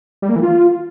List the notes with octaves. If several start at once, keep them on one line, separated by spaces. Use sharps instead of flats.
G3
A#3
E3
F4